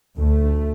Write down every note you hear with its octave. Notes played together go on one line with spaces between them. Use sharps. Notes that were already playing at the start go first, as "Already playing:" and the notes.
D2 A3